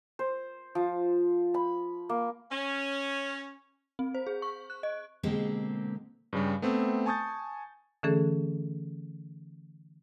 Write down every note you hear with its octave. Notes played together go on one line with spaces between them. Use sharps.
C5
F3
B5
A#3
C#4
C4
C5
G#4
C#6
F#6
D#5
B2 D3 G#3 A#3 C4 G4
G2 C#3 G3
A3 B3 C4
G#5 A5 C#6 D#6 G6 A6
D3 E3 A3 C#4 G#4 A4